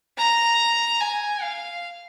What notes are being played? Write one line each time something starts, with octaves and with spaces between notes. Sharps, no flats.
A#5
G#5
F5